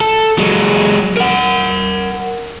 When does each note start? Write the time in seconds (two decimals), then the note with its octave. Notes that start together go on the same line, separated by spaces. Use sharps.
0.01 A4
0.38 F#3 G#3
1.17 A#4 F#5